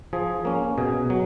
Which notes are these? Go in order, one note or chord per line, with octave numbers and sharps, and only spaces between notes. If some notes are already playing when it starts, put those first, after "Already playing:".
F3 G#4
A#3 C#4
B2 G#4
F#3